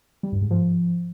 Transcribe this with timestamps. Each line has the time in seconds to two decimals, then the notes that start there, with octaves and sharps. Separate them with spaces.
0.23 G3
0.32 G2
0.42 G#2
0.51 F3